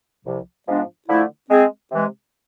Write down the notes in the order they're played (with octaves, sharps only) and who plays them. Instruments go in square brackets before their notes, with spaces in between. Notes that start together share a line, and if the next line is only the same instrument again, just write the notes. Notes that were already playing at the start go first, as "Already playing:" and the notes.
[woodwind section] C2 C3 F3
G#2 F3 G#3 B3 D4
D3 F3 A3 E4
G#3 C4 G#4
C3 E3 G#3